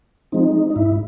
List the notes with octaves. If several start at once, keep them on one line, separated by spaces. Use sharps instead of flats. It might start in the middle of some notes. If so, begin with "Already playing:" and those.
F3 G#3 C4 D#4
D#4
G#2 E4